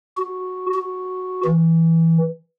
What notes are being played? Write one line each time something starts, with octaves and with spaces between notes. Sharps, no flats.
F#4
F#4
E3